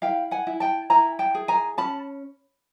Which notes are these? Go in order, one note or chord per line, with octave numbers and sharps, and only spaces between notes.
E4 F5 G5
F#5 G#5
E4
G5 A5
E4 G#5 A#5
G5 A5
G#4
G#5 A#5
C#4 A5 B5